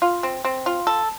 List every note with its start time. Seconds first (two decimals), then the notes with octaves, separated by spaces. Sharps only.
0.02 F4
0.23 C4
0.45 C4
0.66 F4
0.87 A4